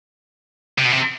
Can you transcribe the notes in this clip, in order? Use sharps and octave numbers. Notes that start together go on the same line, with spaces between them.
C3
B2
C3